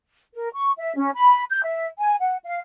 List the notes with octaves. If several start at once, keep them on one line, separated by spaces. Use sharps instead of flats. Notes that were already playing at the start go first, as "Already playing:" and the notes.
A#4
C#6
E5
C#4
B5
G6
E5
G#5
F#5
F5